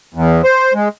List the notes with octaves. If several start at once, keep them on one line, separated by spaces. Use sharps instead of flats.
E2
C5
G#3